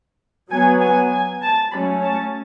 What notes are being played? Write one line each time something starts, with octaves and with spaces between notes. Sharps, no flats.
F#3 B3 G#5
G#5
G#5
A5
F#3 A3 C#4 B5
A5